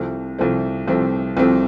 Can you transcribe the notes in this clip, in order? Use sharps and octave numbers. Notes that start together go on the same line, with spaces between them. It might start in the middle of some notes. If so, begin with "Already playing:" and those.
Already playing: C2 C3 F3 A3 C4
C2 C3 F3 A3 C4
C2 C3 F3 A3 C4
C2 C3 F3 A3 C4